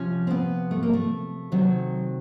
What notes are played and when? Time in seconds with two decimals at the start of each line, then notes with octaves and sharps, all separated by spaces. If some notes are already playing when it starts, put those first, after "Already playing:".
Already playing: C3 F3 C#4
0.27 C4
0.31 B3
0.71 A3
0.83 A#3
0.93 A3
1.52 C3 D#3 F#3